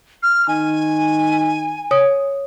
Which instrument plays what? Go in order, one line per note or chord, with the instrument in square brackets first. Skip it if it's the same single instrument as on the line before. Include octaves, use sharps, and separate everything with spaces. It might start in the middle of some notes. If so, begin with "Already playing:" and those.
[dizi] F6
[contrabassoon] D#3 [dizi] G#5
[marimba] C#5 D#6